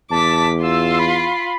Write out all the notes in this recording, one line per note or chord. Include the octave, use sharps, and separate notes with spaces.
E2 A5 D6 B6
F4 C6 E6
B5